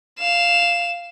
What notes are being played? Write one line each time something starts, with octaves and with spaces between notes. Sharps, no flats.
F5 E7